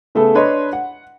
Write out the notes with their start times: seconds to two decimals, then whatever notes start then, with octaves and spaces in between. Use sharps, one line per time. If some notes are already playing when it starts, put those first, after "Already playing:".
0.15 C#3 A3 B3 A4
0.35 D4 B4 C#5 D#5 C6
0.73 F#5